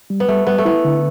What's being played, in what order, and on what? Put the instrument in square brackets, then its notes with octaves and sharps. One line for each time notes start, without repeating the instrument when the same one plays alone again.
[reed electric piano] G3
[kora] B3
[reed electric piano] G3 [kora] A3
[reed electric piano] G3 [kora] B3
[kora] A3
[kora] B3 [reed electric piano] E4
[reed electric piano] D3